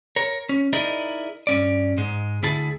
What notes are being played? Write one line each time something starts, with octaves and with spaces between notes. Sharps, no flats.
A#4 C#5
C#4
D#4 E4 G#4 A#4 D5 D#5
G2 C#4 D5
G#2 G#3
D2 E4 G#4 A5